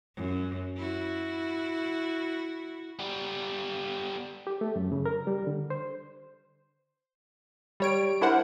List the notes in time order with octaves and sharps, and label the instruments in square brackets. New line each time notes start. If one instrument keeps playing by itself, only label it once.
[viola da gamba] F#2
E4 F#4
[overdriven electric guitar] G3 B3
[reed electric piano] G4
A3
F#2
C#3
A#4
G3
D3
C5
[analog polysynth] G3 C#5 D7
D4 E4 A#4 C5 F#5